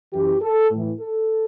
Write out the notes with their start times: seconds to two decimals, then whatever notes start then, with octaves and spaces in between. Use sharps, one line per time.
0.13 F#2 E3 G4
0.41 A4
0.70 A2
0.76 E3
0.99 A4